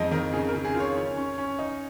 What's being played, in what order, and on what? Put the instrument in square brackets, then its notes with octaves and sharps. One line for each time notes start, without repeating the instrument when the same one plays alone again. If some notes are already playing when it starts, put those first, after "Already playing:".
Already playing: [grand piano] F2 G#3 D#4 D#5
D#3 A#4
C#3 G#4
A#4
C#3
G#4
F4
C#5
C#4
C#4
C#4
D#4